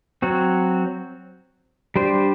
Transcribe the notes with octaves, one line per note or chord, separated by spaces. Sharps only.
F#3 C4 F#4
G3 D4 G4 C5